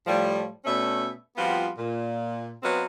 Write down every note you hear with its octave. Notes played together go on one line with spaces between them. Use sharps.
A2 F3 G3
B2 A3 C#4 D4 E5
F3 G3 B3 C4 F4 F#4
A#2
F#3 B3 C4 B4 D#5 F5